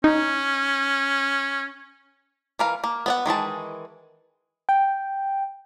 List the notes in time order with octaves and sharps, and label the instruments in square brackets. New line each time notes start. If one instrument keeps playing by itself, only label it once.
[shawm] C#4 [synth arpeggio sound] D#4
[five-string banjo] E3 A#4 F5
A#3
B3 D5 F#5
D#3 E3 G#3 A5
[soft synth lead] G5